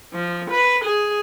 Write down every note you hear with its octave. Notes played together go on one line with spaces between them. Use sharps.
F3
B4
G#4